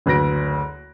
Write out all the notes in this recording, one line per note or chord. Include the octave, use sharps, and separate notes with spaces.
F#1 D2 B4 F#6 A#6 D7